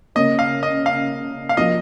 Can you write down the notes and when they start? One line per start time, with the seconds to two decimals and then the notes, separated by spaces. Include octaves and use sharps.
0.15 C#3 A#3 C#4 D#5
0.39 F5
0.63 D#5
0.86 F5
1.49 F5
1.57 F3 A#3 D#4 D#5